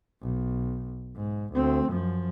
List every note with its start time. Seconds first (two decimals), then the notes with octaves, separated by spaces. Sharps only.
0.22 B1
1.16 G#2
1.54 D2 C4
1.90 F#2 F3